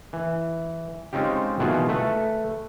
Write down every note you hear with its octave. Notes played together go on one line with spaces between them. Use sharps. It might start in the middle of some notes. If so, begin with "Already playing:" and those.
E3
G#3 C4 C#4 D#4 F4 G4
B2 D#3 E3 F4 F#4 G#4
A3 A4 B4